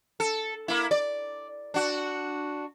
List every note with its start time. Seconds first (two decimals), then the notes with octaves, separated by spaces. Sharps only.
0.20 A4
0.68 A#3 E4
0.91 D5
1.74 D4 F#4